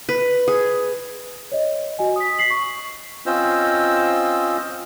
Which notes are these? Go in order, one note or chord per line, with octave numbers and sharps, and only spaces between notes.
B4
G#4
C#5 D#5
F#4 D#5 G#5
D#6 B6
B6 C7 F#7
C#6
C4 C#4 F4 C5 D#5 E6